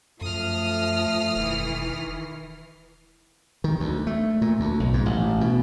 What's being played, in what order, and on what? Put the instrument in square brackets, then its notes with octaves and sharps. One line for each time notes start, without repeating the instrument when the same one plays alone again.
[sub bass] F#2 [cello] F3 [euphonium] A3 [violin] D#6 F6
[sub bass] E1 [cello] D#3 E3
[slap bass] D#3
D2
A3
A#2
D2
B1
G#2
A1
B2